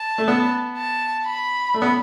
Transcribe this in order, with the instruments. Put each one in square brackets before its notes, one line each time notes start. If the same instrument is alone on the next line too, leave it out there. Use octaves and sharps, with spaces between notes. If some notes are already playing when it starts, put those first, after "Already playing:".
Already playing: [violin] A5
[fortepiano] A3
B3
[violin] A5
B5
[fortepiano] A3
B3